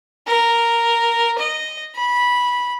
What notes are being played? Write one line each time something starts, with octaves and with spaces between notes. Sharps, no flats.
A#4
D#5
B5